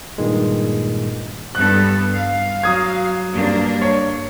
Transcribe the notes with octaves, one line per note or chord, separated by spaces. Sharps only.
G2 A#2 D#3 G#3
G2 B3 A4 F#6
F5
F#3 D#6 G#6
G2 A#3 D4
C#5